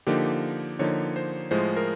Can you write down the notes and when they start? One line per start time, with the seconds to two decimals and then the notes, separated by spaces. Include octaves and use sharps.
0.07 D3 F3 A#3 D#4 G4
0.79 D3 F3 A#3 D#4 C#5
1.16 C5
1.51 A2 F3 G#3 C5
1.76 A#4